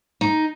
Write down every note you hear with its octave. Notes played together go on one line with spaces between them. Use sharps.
D#4